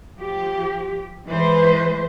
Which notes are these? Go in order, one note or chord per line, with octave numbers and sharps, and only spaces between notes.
F3 G4
E3 G#3 B4 C5